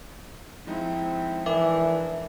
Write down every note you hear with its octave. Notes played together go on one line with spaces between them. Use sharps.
F3 G#3 C4 D#4 E4
E3 D4 A#4 E5 D6